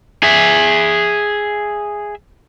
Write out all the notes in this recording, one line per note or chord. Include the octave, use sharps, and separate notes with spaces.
G#4 E5